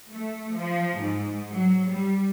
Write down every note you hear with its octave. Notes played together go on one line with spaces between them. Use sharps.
A3
F3
G#2
F#3
G3